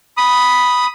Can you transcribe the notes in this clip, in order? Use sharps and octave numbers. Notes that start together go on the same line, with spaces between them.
B5 D#6